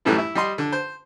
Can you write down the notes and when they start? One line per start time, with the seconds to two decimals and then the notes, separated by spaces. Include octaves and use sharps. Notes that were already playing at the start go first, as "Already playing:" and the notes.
0.05 F#2 A2 E3 F#3 G3 A3
0.18 E4
0.35 G3 D#5 C6
0.58 D3
0.72 C5